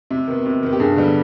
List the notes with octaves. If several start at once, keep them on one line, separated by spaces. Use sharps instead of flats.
C3
D#3 B3
C3
D#3 B3
G4
G2 G#4
D3 G3 B3